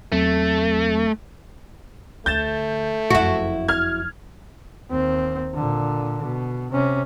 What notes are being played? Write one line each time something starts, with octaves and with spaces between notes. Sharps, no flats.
E2 F#3 A3 C4
D2 A3 G6 A6 E7
F#1 F2 E4 F#4
F6 G#6
D#2 C4
A#2 D3
B2
C3 C#4